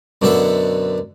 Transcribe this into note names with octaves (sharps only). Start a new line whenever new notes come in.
F#2 B2 D3 E5 F#5